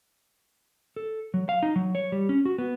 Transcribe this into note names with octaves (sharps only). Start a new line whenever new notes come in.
A4
F#3
F5
D#4
F#3
C#5
G3
C#4
F#4
B3